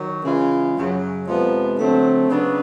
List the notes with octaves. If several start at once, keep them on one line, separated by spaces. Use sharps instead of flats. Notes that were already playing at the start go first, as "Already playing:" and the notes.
Already playing: D#3 F#3
C#3 E3 G#3 C#4 F4
F#2 C#3 F#3
F2 C3 F3 G#3 B3
D3 F#3 A3 C4
C#3 F#3 B3 D4